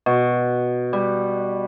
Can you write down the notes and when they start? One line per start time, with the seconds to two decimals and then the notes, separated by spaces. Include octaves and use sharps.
0.06 B2
0.93 G3